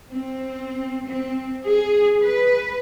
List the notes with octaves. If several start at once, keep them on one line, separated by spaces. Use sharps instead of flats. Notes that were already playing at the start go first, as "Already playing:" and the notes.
C4
C4
G#4
B4